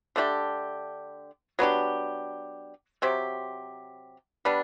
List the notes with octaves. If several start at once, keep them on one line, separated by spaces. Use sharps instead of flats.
D3 A3 D4 G4
F#3 B3 D4 G4
C3 F#3 C4 G4
G3 B3 D4